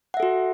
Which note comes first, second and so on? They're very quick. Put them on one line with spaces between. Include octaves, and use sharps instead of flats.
F#5 E5 A4 F#4